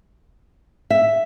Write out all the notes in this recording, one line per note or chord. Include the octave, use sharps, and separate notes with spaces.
E5